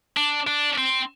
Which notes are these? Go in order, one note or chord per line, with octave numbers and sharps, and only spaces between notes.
D4
D4
C4